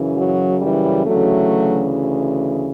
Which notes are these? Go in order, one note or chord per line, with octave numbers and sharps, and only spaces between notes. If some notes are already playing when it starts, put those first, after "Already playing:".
Already playing: F#2 C#3 E3
F#3
E3 G3
D2 C#3 E3 F#3 A3